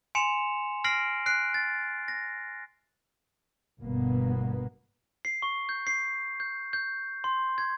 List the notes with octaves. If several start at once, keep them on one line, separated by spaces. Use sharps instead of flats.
G#5 C6 C#7 E7 F7
F6 A#6 C7 D7 F#7
F#6 C7 D7
A6
A#6
G1 G2 B2 A#3 B3
C7
C#6
G6
C7
G6
G6
C6
G#6